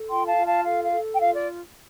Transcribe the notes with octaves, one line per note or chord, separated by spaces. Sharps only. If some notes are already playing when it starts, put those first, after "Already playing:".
Already playing: A4
F4 G5 C6
F5 A5
F4
F5 A5
A4 F5
F5
A4
G5
F4 F5
D5